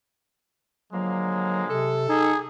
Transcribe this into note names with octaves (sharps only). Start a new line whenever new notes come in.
D3 F3 F#3 G#3 A#3
C3 A4
D#4 G#4